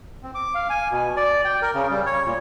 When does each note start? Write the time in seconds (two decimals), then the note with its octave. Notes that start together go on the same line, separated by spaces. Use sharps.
0.23 C4
0.35 D6
0.55 F5
0.70 G#5
0.91 B2
1.17 D5
1.45 G5
1.62 A#4
1.74 C#3
1.90 G3
2.06 C#5
2.25 A#2